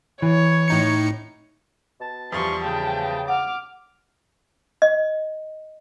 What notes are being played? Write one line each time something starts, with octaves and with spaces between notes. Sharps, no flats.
E3 C#5
A2 D#4 C#7
B2 A5
E2 F3 G3 C6 C#6
C#3 G5 A5
F#5 D6 F6
D#5